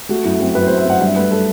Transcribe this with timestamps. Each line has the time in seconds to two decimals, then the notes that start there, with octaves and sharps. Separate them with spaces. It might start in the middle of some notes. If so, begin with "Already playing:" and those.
0.09 A3 F#4
0.24 F#2 E4
0.40 F#2 C4
0.55 F#2 B4
0.67 C5
0.70 A3
0.77 E5
0.86 F#2 F#5
1.01 G2 E5
1.16 A3 B4
1.31 A4